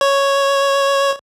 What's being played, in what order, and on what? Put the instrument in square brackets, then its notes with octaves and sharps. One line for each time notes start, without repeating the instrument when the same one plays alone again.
[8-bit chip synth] C#5